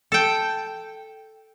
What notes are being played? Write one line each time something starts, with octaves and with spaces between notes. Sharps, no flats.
A4 G5